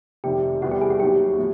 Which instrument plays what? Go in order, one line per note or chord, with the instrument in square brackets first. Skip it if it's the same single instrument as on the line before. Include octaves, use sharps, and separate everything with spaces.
[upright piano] F1 F2 C3 D#3 [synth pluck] G4
[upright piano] E2 C3 E3 G3 B3 [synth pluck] F#4
[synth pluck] G4
G#4
F#4
[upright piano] D#2 D#3 F#3 [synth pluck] G4
[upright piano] A2 F3